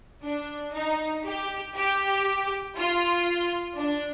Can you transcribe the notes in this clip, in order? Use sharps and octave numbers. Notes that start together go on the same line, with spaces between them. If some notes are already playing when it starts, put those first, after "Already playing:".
D4
D#4
G4
G4
F4
D4